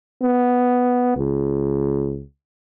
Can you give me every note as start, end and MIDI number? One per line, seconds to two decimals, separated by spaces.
0.23 1.13 59
1.17 2.23 37